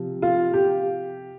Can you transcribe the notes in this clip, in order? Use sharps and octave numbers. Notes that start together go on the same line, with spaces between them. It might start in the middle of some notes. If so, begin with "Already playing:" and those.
Already playing: C3 F3
F4
G4